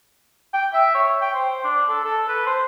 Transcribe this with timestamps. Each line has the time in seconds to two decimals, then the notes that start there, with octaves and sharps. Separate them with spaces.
0.53 G5
0.73 E5
0.94 C#5
1.22 G5
1.34 C5
1.64 D4
1.89 A4
2.04 A4
2.29 B4
2.47 C5